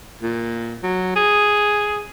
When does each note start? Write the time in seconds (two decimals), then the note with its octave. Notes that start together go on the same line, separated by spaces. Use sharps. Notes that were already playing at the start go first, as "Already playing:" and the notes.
0.21 A#2
0.83 F#3
1.16 G#4